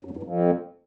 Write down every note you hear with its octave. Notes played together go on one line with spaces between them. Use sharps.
F#2
E2
G2
F2